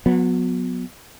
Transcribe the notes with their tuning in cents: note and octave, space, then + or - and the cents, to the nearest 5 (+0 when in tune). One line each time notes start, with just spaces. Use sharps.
F#3 -30 B3 +0